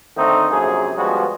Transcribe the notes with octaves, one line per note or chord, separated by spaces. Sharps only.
D3 D#3 A3 C4 D#4
A#1 F#2 C3 A#3 G#4
F3 G3 G#3 B3 C#4 F#4